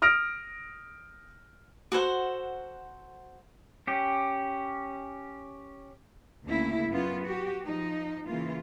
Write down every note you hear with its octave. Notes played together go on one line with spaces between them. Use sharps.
D#6 F6 A#6 D7
F#4 A4 C5 F#5
C#4 G4
D2 C#3 A#3 E4
F#2 B3 C#4 F4
F#4 G4
F3 D#4
C#3 E3 A#3 F4